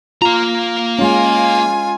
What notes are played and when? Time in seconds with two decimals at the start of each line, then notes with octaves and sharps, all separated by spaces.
0.22 A#3 F4 A#5
0.99 G#3 C#4 F4 G#5